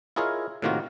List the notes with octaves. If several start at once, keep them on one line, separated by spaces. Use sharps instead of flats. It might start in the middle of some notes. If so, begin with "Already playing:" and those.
E4 F4 G#4 A#4 C#5 D#5
A2 C3 D#3 A#3 F4 F#4